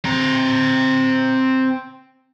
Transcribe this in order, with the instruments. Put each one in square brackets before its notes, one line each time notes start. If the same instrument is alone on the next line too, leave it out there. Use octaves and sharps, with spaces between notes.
[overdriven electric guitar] C4 A#5